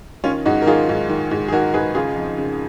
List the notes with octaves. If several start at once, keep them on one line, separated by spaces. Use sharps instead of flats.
D#3 C#4 F4
G#2 D#4 F#4
A#4
D#3 F4 G#4
G#2
D#3
G#2
G#4
D#3 F#4 A#4
G#2 G#4 B4
C#3 F4 G#4
F2
C#3